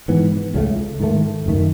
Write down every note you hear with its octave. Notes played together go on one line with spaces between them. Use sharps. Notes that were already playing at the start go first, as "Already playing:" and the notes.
G#2 E3 B3
C#2 C#3 F#3 A3
G#2 D#3 A3
F#1 F#2 D#3 A3